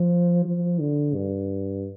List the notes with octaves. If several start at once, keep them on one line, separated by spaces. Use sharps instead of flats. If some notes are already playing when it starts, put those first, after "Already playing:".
Already playing: F3
F3
D3
G2